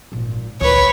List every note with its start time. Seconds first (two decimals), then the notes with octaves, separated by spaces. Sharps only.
0.12 G#1 A#2
0.61 D2 B4 C#5